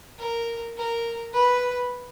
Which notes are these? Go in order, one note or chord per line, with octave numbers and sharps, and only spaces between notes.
A#4
A#4
B4